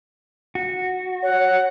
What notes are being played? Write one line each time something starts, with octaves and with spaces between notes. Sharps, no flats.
F#4
C#5 F#5